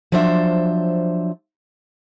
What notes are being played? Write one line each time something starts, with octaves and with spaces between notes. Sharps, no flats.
F3 F#3 D4 C5 C#5 E5